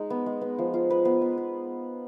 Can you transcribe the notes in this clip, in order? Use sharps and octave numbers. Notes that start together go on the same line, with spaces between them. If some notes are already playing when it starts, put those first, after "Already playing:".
Already playing: G#3 D#4
B3
G#3
B3
F3
F4
B4
B3
B3
B4